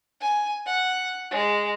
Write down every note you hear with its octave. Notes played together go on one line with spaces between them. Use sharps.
G#5
F#5
G#3